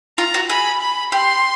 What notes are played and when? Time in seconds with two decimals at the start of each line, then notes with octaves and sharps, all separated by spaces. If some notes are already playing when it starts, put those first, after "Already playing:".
0.18 F4 A#5
0.34 F#4
0.50 G#4 B5
0.82 B5
1.12 G4 C6